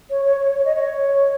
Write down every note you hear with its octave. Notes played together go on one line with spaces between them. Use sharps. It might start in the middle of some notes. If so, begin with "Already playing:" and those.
C#5
C#5
C#5
C#5
D#5
C#5